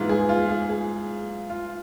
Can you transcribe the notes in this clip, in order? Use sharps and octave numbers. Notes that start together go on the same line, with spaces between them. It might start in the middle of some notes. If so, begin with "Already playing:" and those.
Already playing: G#2 E3 B3 F4
G#4
F4
G#4
G#4
F4